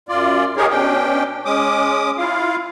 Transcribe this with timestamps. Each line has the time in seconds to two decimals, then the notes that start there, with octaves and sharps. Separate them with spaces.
0.09 F#2 F4 D5
0.57 D#4 G4 G#4 A#4 C#5
0.70 B2 C#4 D4 G5
1.45 G#3 C#4 D6 D#6
2.18 E4 F4 F5